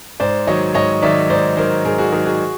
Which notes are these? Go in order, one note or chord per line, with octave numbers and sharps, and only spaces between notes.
G#2 C5 D5
D#3 F#3 C#5 D#5
G#2 C#5 D#5
D#3 F#3 D5 E5
G#2 C5 D5
D#3 F#3 A#4 C5
G#2 G#4 A#4
F#4 G#4
D#3 F#3 G#4 A#4
F#4 G#4